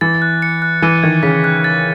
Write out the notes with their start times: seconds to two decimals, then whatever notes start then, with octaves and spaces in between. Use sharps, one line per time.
0.01 E3 A6
0.22 F#6
0.42 C#7
0.62 F#6
0.82 E3 D#7
1.03 D#3 G#6
1.23 C#3 B6
1.44 F#6
1.64 A6